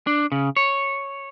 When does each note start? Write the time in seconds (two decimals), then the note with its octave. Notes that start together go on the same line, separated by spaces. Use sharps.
0.07 D4
0.32 C#3
0.56 C#5